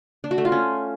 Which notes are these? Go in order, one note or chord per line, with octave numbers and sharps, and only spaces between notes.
D4
F#4
A3
F4
C#4